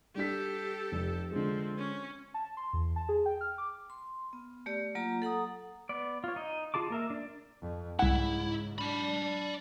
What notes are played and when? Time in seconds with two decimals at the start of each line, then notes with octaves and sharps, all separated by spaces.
0.15 G3 D4 G4 A4 B6
0.92 F1
1.32 D3 F3 G#3 C4
1.78 C#4
2.34 A5
2.57 C6
2.73 E2
2.96 A5
3.09 G#4
3.26 G5
3.41 F6
3.58 D6
3.90 C6
4.33 B3
4.66 A3 G4 D5
4.95 F#3 A#3 F4 A#5
5.22 A4 F#5 A#5 D#6
5.89 B3 D5
6.24 F4 C#5
6.36 D#4 D#5
6.74 F4 G#4 A5 D6
6.90 A#3 A#4 E5
7.10 D4 D5
7.61 F2
7.99 C2 G#2 C#3 E4 F#5
8.79 D4 D5 B5